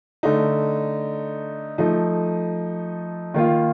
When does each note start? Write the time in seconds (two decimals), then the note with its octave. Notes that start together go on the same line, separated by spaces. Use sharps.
0.23 D3 A3 D#4
1.78 F3 A3 D#4
3.34 D#3 A#3 F4